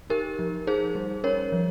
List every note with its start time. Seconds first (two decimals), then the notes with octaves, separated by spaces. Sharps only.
0.10 D#4 G4 A#4
0.39 F3
0.67 D#4 G#4 C5
0.95 G3
1.24 C#4 A#4 C#5
1.52 F3